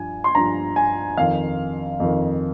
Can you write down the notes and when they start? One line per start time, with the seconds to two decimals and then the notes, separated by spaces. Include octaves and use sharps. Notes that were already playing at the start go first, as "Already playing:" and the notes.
Already playing: G2 F3 G#5
0.24 C6
0.35 G2 F3 A#5
0.76 G#5
1.17 F2 D#3 F5
2.00 F2 D#3